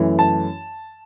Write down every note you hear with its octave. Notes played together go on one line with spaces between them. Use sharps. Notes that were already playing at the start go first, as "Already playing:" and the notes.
Already playing: F#2 E3 A3
A5